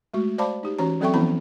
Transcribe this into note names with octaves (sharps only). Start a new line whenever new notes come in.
G#3 A3 F#4
C5 D5 F5 A5 B5 D6
D#4 G4
E3 C#4 F#4 C#5 A#5
F#3 C4 A4 E5 G5 C#6
E3 F3 B3 C#4 E4 B5